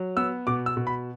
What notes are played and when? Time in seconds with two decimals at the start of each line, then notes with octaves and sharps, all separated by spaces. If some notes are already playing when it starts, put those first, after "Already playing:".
Already playing: F#3
0.17 B3 E6
0.47 B2 D6
0.66 E6
0.77 B2
0.87 B5